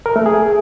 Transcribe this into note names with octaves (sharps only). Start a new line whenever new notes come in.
A#4
A3
G#4